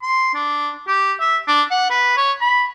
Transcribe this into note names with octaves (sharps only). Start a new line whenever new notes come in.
C6
D4
G4
E5
D4
F#5
B4
C#5
B5